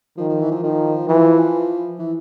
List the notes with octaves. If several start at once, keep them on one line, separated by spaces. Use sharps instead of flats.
D#3 F3
F3
E3
F3
D#3 F3
E3 F3
E3